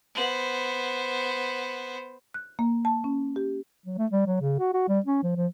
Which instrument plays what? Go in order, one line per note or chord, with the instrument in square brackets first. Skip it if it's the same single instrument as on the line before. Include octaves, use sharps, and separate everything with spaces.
[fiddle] B3 C5
[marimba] F#6
A#3
A5
C#4
G4
[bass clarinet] F#3
A3
G3
F#3
C#3
F#4
F#4
G3
C#4
F3
F3